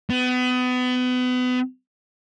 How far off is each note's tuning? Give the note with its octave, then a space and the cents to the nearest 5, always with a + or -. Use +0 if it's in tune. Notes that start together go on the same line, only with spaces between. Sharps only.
B3 +30